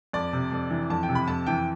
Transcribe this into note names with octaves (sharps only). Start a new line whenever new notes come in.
F2 D5
C3
F2
E3
F2 A5
G5
C3
B5
F2 A5
E3 G5